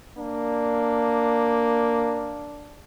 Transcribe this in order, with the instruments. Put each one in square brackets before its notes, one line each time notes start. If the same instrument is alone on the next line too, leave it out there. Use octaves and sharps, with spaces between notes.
[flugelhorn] A#3 [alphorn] D4